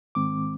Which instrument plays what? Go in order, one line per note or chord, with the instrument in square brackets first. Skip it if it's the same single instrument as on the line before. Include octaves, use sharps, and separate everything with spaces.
[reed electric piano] G#2 D#3 G#3 C4 D6